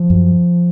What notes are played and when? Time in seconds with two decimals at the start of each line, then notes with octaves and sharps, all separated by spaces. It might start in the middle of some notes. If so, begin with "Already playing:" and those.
Already playing: F3
0.10 F#2